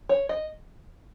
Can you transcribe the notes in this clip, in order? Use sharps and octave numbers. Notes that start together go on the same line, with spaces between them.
C#5
D#5